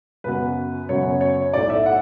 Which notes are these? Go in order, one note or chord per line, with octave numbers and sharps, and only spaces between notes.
F#2 C#3 F#3 B3 B4
F#2 C#3 F#3 B3 C#5
C#5
B1 A2 F#3 A3 D5
E5
F#5